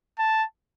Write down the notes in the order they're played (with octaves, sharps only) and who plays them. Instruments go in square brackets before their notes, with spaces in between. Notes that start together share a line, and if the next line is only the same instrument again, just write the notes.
[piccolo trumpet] A5